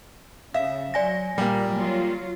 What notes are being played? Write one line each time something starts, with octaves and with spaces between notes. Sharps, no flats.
C#3 E5 F5
F#3 D5 G#5 A#6
A#2 G3 A#3
F#3 F4